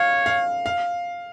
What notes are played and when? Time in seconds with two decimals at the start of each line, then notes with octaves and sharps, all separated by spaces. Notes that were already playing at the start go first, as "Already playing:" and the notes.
Already playing: C#5 F5
0.26 F5
0.66 F5